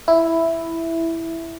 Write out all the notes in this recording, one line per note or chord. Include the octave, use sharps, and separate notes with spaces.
E4